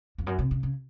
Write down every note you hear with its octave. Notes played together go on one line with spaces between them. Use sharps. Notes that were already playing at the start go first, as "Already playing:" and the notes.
F2
F#2
C3
C#3
C#3